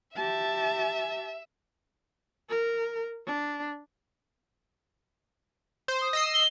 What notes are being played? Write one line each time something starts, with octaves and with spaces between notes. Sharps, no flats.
G4 E5 A5
A#4
D4
C5
D#6
D#5 E6 C7
G7